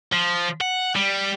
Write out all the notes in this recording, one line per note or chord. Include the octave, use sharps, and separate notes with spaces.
F3
F#5
G3